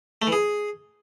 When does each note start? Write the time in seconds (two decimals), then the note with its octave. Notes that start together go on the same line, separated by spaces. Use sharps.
0.22 A3
0.27 E3
0.32 G#4